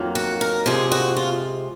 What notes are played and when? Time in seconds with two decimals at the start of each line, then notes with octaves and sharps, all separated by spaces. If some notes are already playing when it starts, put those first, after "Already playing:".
Already playing: F2 D#3 F#3 A#3
0.15 F#4
0.41 A#4
0.66 F2 C3 F3 G#3 G#4
0.92 F#4
1.17 F4